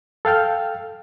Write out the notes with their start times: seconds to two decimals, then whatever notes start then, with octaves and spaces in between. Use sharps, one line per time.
0.25 A4 F5 G5 F6